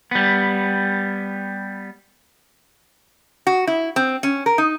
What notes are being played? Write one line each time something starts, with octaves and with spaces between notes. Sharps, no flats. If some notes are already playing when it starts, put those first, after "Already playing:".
G3 B3
F#4
E4
C4
C#4
A#4
D#4